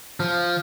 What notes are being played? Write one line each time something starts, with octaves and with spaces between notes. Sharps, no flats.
F3